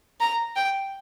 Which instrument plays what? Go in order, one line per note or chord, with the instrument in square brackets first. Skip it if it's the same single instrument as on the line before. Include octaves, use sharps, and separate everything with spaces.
[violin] A#5
G5